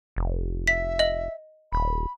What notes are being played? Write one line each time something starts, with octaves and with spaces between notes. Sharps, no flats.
F1
E5 B6
D#5 F#7
D#1 B5